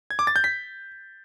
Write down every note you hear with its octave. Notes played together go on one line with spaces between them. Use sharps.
G#6
D6
A6
G6
B6